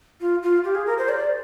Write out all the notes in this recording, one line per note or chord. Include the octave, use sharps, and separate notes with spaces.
F4
F4
G4
G#4
A#4
C5
D5